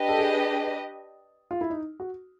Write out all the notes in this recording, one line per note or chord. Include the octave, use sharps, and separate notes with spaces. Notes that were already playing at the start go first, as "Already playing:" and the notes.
Already playing: D4 G4 B4 D#5
A4
G#4
F4
E4
D#4
F#4